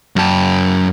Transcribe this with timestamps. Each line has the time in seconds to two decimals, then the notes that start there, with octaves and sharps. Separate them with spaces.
0.16 F#2 A5